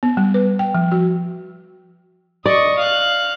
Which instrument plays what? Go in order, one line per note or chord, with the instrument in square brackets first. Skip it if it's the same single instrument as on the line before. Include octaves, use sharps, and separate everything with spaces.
[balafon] B3
G3
B4
G5
F3
F#4
[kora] D5 [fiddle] D#5 C#6
[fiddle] F5 F#6